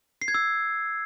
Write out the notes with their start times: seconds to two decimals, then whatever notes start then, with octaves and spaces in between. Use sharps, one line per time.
0.22 C7
0.28 G#6
0.34 E6